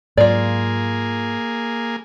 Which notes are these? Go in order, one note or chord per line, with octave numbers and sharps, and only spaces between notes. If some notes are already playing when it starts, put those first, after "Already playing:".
G#2 F#3 A#3 F4 G#4 D5